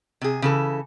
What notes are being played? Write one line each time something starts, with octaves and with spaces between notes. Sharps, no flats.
C3 G#4
C#3 E3 A4